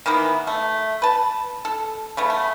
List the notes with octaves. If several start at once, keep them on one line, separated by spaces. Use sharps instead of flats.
D#3 E3 A#3 B3
A3
B4 A5
A4
C#3 A3 B3
A3